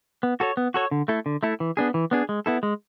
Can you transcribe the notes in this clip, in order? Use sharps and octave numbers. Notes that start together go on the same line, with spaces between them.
B3
F#4 A4 C#5
B3
F#4 A4 C#5
D3
A3 E4 A4
D3
A3 E4 A4
E3
B3 D4 G#4
E3
B3 D4 G#4
G#3
B3 E4 A4
G#3